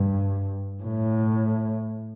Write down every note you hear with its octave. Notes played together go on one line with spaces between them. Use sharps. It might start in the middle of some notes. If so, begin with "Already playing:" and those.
Already playing: G2
A2